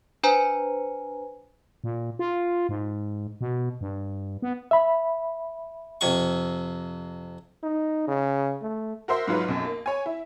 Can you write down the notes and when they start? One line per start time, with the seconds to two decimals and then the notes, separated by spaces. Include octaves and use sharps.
0.23 D4 B4 C5 G#5 A#5
1.84 A#2
2.19 F4
2.69 G#2
3.41 B2
3.81 G2
4.42 B3
4.71 E5 B5
6.01 F2 C3 C#6
7.63 D#4
8.08 C#3
8.62 A3
9.08 F#4 A#4 C5 E5 C6
9.27 G#2 F#3 F4 B4
9.48 B1 F#2
9.65 A#3
9.86 C#5 G#5
10.06 E4